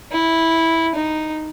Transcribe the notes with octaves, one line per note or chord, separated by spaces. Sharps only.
E4
D#4